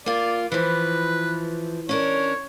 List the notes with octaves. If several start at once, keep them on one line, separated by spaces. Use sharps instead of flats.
A#3 F4 D5
E3 F3 B4
C#4 D4 A#4 C#5